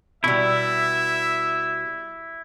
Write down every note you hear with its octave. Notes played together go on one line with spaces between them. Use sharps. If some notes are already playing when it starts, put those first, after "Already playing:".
B2 G3 E4 E5